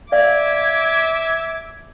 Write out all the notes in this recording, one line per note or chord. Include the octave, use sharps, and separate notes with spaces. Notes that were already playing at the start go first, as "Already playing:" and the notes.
D5 E5 F5 D6 G#6